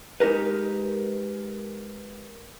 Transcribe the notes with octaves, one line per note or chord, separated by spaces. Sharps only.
G#3 D#4 G4 A#4 B4